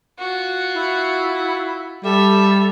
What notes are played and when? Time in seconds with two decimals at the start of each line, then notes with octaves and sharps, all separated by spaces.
0.19 F4 F#4
0.74 E4
2.04 G3 A4 E5